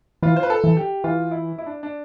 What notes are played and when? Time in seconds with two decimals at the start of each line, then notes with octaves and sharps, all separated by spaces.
0.22 E3 F4
0.36 C5
0.43 B4
0.50 A4
0.64 E3
0.77 G4
1.04 E3 F4
1.31 E4
1.58 E4
1.66 D4
1.83 D4